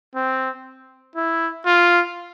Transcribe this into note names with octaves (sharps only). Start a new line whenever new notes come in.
C4
E4
F4